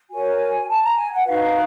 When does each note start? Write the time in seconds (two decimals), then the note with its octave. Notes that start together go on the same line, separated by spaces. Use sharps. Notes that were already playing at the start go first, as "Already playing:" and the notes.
0.10 F#4 A#4 C#5 G#5
0.68 A5
0.82 A#5
0.97 G#5
1.11 F#5
1.25 D#4 F#4 B4 F5